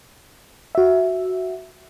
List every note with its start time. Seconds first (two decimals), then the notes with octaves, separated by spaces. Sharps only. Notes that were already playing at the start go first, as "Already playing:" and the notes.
0.75 F#4 E5